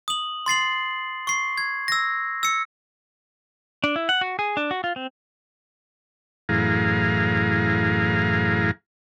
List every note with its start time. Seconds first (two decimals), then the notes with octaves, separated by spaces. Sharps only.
0.08 D#6 F#7
0.46 C6 A6 C7 F#7
1.27 C#6 C7
1.58 G#6
1.88 E6 A#6
2.43 E6 C#7
3.84 D4
3.96 E4
4.09 F#5
4.21 F#4
4.39 G#4
4.57 D4
4.71 F#4
4.84 F4
4.96 C4
6.49 F#2 A2 E3 G#4 F5 A#5